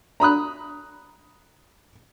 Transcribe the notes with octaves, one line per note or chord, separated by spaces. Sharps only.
A#5 B5 D#6 F#6